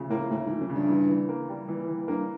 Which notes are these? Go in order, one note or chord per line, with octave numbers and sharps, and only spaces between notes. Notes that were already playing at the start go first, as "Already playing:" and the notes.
Already playing: D2 C#3 F3
A2 A#3
D2 A2
G#2
F3
F#2
C#3
G2
E3
E3
A#3
G3
E3
E3
G2 A#3